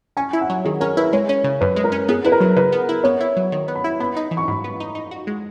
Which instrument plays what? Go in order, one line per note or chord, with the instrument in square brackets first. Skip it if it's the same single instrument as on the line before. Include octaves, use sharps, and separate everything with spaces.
[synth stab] C#4 [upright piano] G#5
[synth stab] E4
[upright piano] F#5
[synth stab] F#3
[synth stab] D#3 [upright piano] G#4
[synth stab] C#4 [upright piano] A#4
[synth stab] E4 [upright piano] B4
[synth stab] G#3 [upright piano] C#5
[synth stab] C#4
C#3
[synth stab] F#2 [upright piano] B4
[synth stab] G#3
[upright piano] A#4
[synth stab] C#4
[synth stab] B3 [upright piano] G#4
[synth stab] E4 [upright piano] B4
[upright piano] A#4
[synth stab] F#3
[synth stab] C#3 [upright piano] B4
[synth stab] B3
E4
[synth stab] B3 [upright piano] C#5
[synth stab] E4
F#3
D#3
B3
[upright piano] B5
[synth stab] E4
[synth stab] B3 [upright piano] B5
[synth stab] D#4
E3
[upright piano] C#6
[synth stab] G#2 [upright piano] B5
[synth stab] B3
D#4
D#4
F#4
G#3